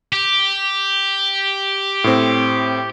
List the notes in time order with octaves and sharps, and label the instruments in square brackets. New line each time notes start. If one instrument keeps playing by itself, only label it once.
[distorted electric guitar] G4
[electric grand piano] A2 C4